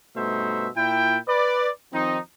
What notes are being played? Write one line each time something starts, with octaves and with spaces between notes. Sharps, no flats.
G2 B2 A3 D#4 C5 E5
A#2 E4 G5
B4 D5
D#3 F3 C4 D#4